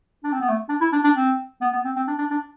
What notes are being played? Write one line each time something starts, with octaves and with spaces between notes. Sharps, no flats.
D4
C4
B3
A3
D4
E4
D4
D4
C4
B3
B3
C4
C4
D4
D4
D4